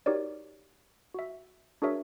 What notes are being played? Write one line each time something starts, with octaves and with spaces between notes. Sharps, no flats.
D#4 F#4 G4 A#4 C#5 D5
F#4 E5
D4 F#4 G#4 A#4 C#5 E5